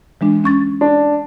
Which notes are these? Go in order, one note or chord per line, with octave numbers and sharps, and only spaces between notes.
E3 G#3 D4
C#4 C#6 A6
D4